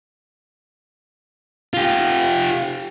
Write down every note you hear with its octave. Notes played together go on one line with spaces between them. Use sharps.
F4 G4